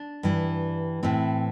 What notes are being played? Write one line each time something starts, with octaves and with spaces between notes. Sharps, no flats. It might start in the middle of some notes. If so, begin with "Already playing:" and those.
Already playing: D4
G2 E3
A2 E3 C4